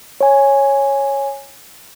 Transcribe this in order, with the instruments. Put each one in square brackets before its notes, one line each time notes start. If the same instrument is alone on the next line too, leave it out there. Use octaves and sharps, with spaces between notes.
[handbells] C#5 G#5